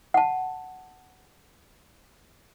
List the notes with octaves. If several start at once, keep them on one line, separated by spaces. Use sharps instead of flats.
F#5 A5